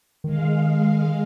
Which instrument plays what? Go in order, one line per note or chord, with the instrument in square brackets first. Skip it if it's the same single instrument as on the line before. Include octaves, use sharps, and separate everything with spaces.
[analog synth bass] D#3 [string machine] G#3 F5